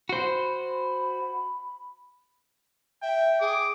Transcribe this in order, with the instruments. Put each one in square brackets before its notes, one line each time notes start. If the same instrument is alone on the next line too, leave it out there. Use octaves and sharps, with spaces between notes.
[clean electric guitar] F#4 C5 [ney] B5
[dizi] E5 [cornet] G5
[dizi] G#4 [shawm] D6